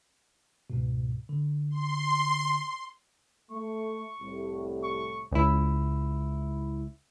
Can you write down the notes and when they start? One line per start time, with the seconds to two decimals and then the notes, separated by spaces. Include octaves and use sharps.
0.70 C#2 G#2 B2
1.29 D3
1.70 C6
3.51 A3 C#6
4.20 C2 A2
4.83 C#6
5.31 C#2 E4